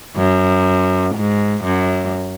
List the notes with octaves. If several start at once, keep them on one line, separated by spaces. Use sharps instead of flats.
F#2
G#2
F#2